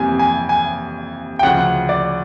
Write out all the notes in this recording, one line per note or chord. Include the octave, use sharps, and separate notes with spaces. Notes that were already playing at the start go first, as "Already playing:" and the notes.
Already playing: F2 C3 E3 G3 A#3 G#5
G#5
G#5
G5
D2 C#3 F3 F#5
D5